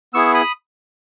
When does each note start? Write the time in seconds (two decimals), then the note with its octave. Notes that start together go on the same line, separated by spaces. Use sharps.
0.13 B3 E4 G#4 C#6 E6
0.34 B5 D#6